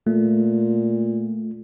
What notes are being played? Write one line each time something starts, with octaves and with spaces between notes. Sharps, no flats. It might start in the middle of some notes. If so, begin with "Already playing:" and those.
A#2 A3